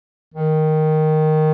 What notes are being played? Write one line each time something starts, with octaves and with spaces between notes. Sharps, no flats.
D#3